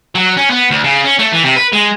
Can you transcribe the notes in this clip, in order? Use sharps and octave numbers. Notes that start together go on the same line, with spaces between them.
F#3
C#4
B3
D2
C#3
C#4
A3
E3
C3
B4
G#3